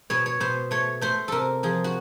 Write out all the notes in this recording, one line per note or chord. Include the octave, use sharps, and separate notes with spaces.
B2 C#5
C#5
B2 C5
A3 C#5
A3 C5
C3 A4 A#4
F3 G#4
F#4